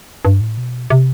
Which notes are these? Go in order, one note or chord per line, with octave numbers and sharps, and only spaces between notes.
G2
A2
B2
C3